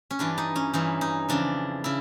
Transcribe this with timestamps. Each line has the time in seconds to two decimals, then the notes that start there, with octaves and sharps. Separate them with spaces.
0.11 C#4
0.19 G2 E3 D4
0.38 D#4
0.56 C#4
0.73 G2 E3 D#4
1.01 D#4
1.29 F2 C#3 E3 D4
1.84 C#3 E4